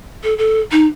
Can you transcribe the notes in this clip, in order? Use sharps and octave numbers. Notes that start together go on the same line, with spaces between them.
A4
A4
D#4